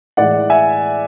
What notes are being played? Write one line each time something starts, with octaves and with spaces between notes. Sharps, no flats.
A2 E3 G#3 D5 F#5
E5 G#5